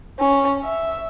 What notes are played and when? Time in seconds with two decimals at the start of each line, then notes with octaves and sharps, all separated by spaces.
0.19 C#4
0.64 E5